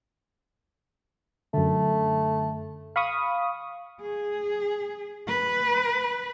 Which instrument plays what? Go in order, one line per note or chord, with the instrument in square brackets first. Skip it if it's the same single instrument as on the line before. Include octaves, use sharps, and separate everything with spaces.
[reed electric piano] F#2 D3 [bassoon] A3
[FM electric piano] F5 B5 C#6 D#6
[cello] G#4
B4